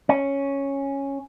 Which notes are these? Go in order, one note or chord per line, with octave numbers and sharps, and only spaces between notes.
C#4